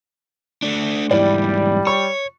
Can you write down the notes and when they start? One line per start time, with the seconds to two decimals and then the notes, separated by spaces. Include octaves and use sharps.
0.62 A3 D4
1.11 E2 G#2 G3 E4 D5
1.87 C#5 C#6